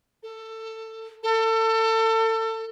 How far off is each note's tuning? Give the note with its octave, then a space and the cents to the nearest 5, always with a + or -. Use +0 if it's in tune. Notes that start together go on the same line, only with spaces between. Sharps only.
A4 +20
A4 +30